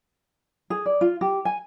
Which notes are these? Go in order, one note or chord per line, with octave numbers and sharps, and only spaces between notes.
G#4
D5
F4
G4
G#5